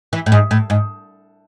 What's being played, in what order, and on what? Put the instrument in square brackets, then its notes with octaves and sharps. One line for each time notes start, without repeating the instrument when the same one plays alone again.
[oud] E3
A2
G#2
A2
G#2